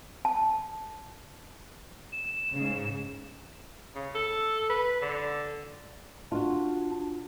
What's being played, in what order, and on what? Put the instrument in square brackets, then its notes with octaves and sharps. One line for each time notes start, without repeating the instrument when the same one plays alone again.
[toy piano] A5
[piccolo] E7
[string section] G#2 C#3
[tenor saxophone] C#3
A4
B4
D3
[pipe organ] D4 [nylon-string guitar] F4 F#4